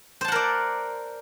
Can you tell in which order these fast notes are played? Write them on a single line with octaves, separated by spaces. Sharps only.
C5 A5 F#5 A#4 D5